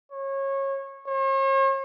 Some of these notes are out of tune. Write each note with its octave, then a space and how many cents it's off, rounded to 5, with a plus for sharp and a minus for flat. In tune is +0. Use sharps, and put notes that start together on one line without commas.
C#5 -25
C#5 -45